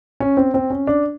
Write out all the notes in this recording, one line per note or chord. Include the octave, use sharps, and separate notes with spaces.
C#4
C4
C4
C#4
D4